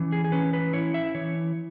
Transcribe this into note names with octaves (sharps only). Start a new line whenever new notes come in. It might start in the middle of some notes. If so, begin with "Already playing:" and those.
Already playing: E3 C#4
G#4
G#4
C#4 B4
B4
E4 C#5
E5
E3 C#5